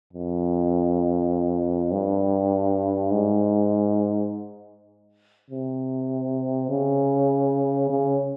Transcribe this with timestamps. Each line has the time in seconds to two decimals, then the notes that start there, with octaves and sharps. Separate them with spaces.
0.13 F2
1.92 G2
3.11 G#2
5.50 C3
6.70 C#3
7.90 C#3